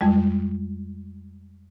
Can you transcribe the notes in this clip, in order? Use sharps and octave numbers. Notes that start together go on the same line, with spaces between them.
F2 G3 G#3